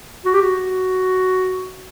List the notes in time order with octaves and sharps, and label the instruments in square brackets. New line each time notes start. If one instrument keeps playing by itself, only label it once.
[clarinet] F#4
G4
F#4